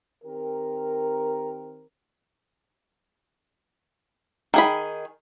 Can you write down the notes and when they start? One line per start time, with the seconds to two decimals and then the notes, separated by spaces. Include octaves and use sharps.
0.24 D#3 C4 G4 A#4
4.54 D#3 G#4 B5